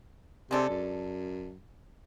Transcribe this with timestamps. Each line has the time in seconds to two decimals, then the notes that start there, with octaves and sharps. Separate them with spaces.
0.51 C3 G#3 D4 A4
0.69 F#2